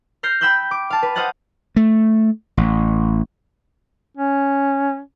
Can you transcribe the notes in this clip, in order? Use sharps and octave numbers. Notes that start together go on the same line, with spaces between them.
F6 G6 A#6 C7
G5 B5 E6 F#6 G6
D6
F5 A5
B4
C5 D#5 F5 F#5 F#6 A6
A3
A1
C#4